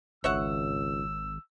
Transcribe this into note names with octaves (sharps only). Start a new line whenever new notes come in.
G#1 C#2 C#5 E5 F#5 E6